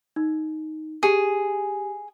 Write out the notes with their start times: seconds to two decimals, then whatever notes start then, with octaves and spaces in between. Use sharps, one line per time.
0.16 D#4
1.03 G4 G#4 G#5